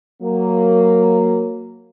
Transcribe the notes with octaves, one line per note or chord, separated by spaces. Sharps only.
F#3 A#3